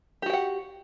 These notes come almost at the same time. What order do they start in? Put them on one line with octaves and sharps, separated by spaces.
G4 F#4 G5 F#5